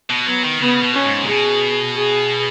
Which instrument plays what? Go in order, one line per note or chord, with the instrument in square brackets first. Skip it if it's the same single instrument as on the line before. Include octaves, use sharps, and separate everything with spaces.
[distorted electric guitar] B2
[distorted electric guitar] F#3 [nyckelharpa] B3
[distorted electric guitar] D#3
[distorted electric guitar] C#3 [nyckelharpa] B3
[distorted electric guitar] B2
[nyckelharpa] C#4
[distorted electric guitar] G#2
C#3
[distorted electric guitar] B2 [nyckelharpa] G#4
[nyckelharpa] G#4